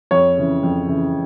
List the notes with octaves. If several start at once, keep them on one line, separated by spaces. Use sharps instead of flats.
F2 C#5
C#3 E3
F2
C#3 E3